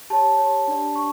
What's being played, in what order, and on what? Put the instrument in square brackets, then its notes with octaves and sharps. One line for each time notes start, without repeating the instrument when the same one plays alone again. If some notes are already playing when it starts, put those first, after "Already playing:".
[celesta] G4 C#5 A5
G4 C#5
D4 G4 D5
D4 C#6